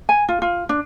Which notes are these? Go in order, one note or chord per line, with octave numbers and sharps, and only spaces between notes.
G#5
F4
F4
D4